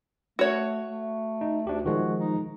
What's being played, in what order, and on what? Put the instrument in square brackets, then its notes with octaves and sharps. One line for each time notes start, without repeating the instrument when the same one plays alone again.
[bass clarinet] A3 [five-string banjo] F#4 C#5
[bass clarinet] A3
[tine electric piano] D#4
[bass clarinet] D2 [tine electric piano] D4 G4
[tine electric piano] D#3 F3 G#3 [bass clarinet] F#4
[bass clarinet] D#4